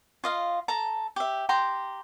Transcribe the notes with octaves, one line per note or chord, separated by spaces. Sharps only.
F4 D#5 F5
A4 A5 A#5
G4 E5
G4 G5 A#5 C6